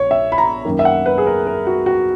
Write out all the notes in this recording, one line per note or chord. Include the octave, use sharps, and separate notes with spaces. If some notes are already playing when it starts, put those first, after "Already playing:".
Already playing: A#1 C#5
E5
B5
A#5
F#2 D#3 A#3
E5
F#5
B4
G#4
A#4
A#4
F#4
F#4